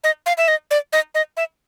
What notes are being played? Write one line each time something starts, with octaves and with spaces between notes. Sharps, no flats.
D#5
F5
E5
D#5
D5
D#5
D#5
E5